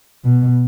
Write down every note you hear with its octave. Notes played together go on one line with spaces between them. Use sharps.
B2